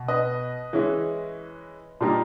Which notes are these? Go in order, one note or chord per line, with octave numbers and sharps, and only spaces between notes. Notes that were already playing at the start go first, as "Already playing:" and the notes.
Already playing: B2
B4 D#5
E3 G#3 C#4 E4
A#2 G3 A#3 D#4